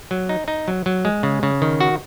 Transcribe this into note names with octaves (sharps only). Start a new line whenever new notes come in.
F#3
D#4
D#4
F#3
F#3
G#3
C#3
C#3
D#3
F#4